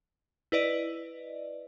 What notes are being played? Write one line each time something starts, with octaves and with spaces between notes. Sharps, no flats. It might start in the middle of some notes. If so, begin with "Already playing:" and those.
E4 B4 D5 D#5